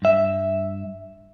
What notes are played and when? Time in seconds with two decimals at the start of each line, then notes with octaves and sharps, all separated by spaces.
0.02 G2 E5